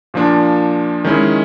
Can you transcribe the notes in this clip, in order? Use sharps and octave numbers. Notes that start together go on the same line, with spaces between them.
A#2 F3 A#3 D4
D#3 G#3 C#4 E4